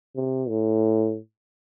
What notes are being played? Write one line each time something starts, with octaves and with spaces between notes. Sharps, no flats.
C3
A2